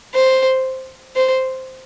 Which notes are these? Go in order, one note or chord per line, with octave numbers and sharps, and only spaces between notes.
C5
C5